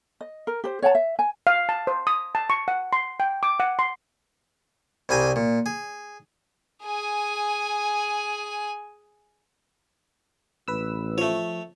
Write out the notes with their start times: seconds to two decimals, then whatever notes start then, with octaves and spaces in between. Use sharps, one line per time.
0.21 D#5
0.47 A#4
0.64 G4 C5
0.82 C#5 F#5 G5 A5
0.95 E5
1.19 G#5
1.47 F5
1.69 A5
1.87 C5
2.07 D#6
2.35 A5
2.50 C#6
2.68 F#5
2.93 C6
3.20 G5
3.43 D6
3.60 F#5
3.79 C6
5.09 C2 G3 G#4 G#5 A#5
5.36 A#2
5.66 G#4
6.84 G#4 G#5
10.68 A1 B4 E6
11.18 F3 A3 C#5